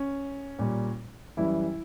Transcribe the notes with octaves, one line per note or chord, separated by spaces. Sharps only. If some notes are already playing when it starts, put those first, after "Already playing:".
Already playing: C#4
A#2 G3
F#2 E3 G3 E4